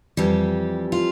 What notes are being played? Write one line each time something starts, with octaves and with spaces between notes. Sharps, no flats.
F2 E3 G3 G4
F4